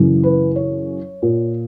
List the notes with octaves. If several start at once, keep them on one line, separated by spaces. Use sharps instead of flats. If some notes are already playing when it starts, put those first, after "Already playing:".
Already playing: F#2 C#3 E3
B4
C#5
A#2